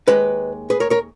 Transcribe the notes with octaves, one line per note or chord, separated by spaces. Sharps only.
D#2 D#3 G#3 B4 D#5
G#4 B4
A#4 C#5
A#4 C#5